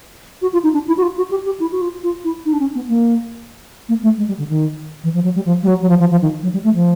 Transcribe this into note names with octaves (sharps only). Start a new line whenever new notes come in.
F#4
F4
D#4
D4
E4
F#4
F4
F#4
G4
G4
E4
F#4
F4
F4
E4
D#4
D4
C#4
B3
A#3
A#3
A3
G#3
G3
D3
D#3
E3
F3
F#3
G3
F3
G3
F#3
F#3
F3
F3
F3
D#3
F#3
G3
A3
F3